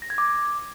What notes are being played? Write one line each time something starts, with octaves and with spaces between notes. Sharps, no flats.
A#6
G#6
D6